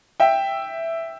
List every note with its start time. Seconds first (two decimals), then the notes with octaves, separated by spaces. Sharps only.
0.20 E5 G5